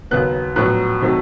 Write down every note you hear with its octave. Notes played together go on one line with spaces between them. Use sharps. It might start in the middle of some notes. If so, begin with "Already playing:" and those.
D#2 C#3 F#3 B3 F#6
A#1 A2 F#3 B3 F#6
C3 D#3 F#3 A3